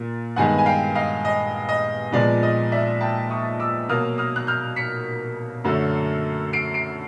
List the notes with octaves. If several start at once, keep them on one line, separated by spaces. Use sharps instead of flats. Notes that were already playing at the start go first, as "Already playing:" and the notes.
Already playing: A#2 A#3
G2 D#3 G#3 B3 F#5 G#5
G#5
F5 G5
D#5 F5
D#5
D#5
A#2 F3 G#3 B3 D5
D#5
D5 E5
G5 A5
C#6 D#6
D6 E6
B2 F#3 A#3 D#6 F6
D#6 F6
F#6
F6 G6
B6 C#7
F#2 D3 F#3 A3
C7 D7
C7 D7